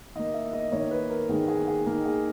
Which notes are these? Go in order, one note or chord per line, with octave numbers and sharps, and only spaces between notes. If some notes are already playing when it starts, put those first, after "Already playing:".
D#3 A#3 D#5
E5
D#5
D#3 A#3 C#5
B4
A#4
D#3 A#3 G#4
G#4
G#4
D#3 A#3 A#4
G#4